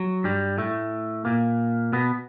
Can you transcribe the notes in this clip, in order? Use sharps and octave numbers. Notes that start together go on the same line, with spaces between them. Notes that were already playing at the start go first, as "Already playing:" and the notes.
Already playing: F#3
G2 G3
A2 A3
A#2 A#3
B2 B3